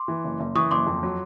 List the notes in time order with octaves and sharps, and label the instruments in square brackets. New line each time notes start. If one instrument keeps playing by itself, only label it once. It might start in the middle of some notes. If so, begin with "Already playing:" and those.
Already playing: [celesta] C6 D6
[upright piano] E3
F#1
F#1
[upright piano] E3 [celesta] C#6 D#6
[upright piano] F#1 [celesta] C6 D6
[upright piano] F2
F#3